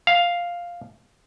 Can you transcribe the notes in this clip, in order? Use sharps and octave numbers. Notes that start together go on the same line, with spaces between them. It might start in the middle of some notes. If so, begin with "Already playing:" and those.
F5